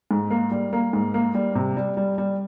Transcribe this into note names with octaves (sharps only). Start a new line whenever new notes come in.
G#2
A#3
G3
A#3
G#2
A#3
G3
C3
G3
G3
G3